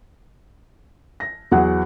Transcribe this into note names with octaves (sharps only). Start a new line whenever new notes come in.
A#6
E2 F#3 G#4 F#5